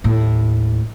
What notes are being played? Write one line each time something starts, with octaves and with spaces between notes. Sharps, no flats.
D#2 A2